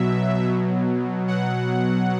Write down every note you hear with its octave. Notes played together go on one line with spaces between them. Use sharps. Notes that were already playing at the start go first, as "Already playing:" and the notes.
Already playing: B2 F#3 E5
B2 F#3
B2 F#3 F#5